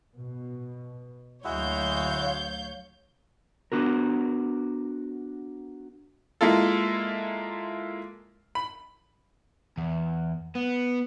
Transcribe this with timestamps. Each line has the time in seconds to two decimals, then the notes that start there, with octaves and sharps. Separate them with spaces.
0.18 B2
1.44 D2 F#3 G#3 E4 F#4 C#5 F5 G6
3.72 B3 D4 F#4 A#4
6.41 G#3 A#3 E4 F4 A4
8.55 B5
9.78 E2
10.56 B3